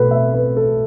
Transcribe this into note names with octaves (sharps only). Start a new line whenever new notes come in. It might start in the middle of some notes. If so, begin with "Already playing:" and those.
Already playing: B2 A3 A4 B4
E5
B4
A4